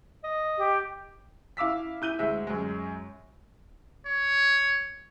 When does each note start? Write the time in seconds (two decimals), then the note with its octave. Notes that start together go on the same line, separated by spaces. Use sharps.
0.24 D#5
0.57 G4
1.57 E4 F5 D6 E6 B6
2.02 E4 G6 D#7 G7
2.19 D2 G#3 E5
2.47 F#2 G#3
4.07 C#5